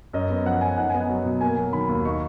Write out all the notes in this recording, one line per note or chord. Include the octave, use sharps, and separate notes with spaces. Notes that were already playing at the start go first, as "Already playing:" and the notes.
F#2 D#5
B3
F3 F#5
F#2 G#5
D#4 F#5
B3 G#5
F#5
F#3
B2
A#3 G#5
F#3
D#3 B5
D#2
D#4 C#6